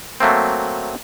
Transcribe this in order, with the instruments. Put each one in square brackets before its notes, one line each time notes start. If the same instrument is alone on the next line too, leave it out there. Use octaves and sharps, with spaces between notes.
[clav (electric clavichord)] F#3 A3 A#3 C4